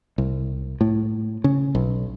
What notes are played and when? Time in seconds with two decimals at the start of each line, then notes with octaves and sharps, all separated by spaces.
0.18 C2
0.81 A2
1.44 C#3
1.75 B1